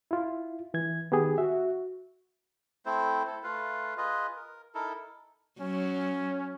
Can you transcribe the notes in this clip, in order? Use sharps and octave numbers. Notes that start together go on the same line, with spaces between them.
E4 F4
E3 G#6
D#3 B3 G4 G#4
F#4 E5
A3 C4 E4 C5
E4 A4
A3 F4 B4 F5
F4 G#4 B4 D#5
A#4
D#4 E4 A4 A#4
F#3 C#4